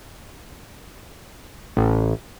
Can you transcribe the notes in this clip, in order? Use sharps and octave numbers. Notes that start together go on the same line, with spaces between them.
A1